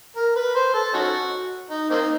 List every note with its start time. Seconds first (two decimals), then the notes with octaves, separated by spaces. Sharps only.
0.16 A#4
0.36 B4
0.55 C5
0.74 A4
0.94 C#4 D#4 F#4
1.71 D#4
1.90 A#3 C4 D#4